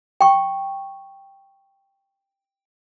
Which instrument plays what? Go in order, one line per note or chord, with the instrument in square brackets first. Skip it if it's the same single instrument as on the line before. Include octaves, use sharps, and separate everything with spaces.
[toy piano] G5 C#6